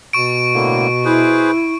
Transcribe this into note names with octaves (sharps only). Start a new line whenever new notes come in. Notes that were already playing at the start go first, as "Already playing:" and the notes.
B2 C#6 D7
A2 D3 A#3
E4 G#4 B4 C5